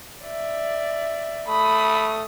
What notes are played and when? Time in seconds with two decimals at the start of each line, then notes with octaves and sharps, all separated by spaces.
0.25 D5 E5
1.49 A3 B5 D#6